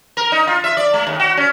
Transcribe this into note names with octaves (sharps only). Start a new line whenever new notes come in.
A#4
D#4
F4
E5
D5
A3
D#2
F#4
C#4